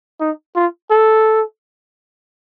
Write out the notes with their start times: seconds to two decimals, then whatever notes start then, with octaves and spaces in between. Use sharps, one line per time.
0.20 D#4
0.56 F4
0.91 A4